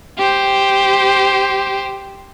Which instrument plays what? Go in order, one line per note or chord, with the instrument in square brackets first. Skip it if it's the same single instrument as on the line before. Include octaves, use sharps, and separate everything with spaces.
[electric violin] G4 C5